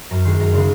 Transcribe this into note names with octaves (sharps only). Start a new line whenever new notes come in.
F#2 A#5
D#3 G#3 C6
F#2 A#5
C#3 G#3 C6